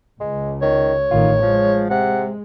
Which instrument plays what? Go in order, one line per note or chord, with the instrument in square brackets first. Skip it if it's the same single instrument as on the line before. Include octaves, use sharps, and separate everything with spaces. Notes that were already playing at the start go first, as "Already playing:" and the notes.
[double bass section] C#2 [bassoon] G#3
[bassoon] D#3 [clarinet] C#5
[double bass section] A1 D#3 [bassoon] F4
[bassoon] F3 [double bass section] G#3
[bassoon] C3 [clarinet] F#5